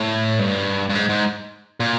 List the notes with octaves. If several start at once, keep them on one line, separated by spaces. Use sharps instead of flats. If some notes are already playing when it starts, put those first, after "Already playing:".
Already playing: A2
G2
G2
G#2
G#2
A#2